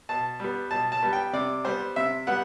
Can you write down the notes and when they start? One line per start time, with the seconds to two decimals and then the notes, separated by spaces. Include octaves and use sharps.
0.09 B2 A5
0.40 G3 B3
0.71 B2 A5
0.92 A5
1.03 G3 B3
1.13 G5
1.33 C3 D5
1.65 G3 B3 C5
1.96 C3 E5
2.27 G3 B3 F#5